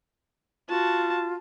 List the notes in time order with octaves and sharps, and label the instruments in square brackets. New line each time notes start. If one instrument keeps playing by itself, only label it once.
[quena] F4 [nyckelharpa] F#4 A5